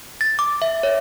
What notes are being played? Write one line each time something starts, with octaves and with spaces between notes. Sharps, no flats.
A6
D6
E5
C#5